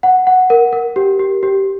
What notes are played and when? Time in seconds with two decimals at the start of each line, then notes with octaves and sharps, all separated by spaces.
0.03 F#5
0.27 F#5
0.50 A#4
0.73 A#4
0.96 G4
1.19 G4
1.43 G4